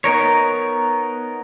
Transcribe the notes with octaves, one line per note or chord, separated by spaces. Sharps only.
B3 D#4 A#4 C#5